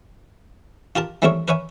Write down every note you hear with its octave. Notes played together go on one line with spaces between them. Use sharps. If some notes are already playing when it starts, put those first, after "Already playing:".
F4 G4 A#4 A5
E3 G3 A3 C4 A#4 C#5
A#4 B4 C#5 E5 G#5